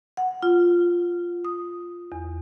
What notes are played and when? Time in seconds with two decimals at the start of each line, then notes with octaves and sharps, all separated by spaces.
0.17 F#5
0.43 F4
1.45 D#6
2.12 E2